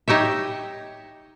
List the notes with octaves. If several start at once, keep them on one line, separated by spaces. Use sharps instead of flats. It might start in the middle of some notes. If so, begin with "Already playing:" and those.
D#4 G4 C#5 E5